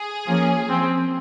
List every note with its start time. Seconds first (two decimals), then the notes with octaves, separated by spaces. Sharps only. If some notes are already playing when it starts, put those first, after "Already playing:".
Already playing: G#4
0.27 F3 A#3 C#4
0.69 F3 C4